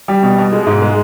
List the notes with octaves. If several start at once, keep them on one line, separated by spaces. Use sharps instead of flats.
G3
B2
B2
G#3
G#2
G#3